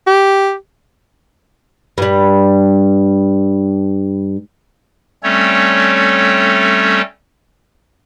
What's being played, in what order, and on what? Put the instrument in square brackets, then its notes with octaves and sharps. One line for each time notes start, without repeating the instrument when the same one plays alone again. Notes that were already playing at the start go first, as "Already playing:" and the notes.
[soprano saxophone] G4
[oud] G2 G3
[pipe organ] G3 A3 C4 C#4 A4 C#5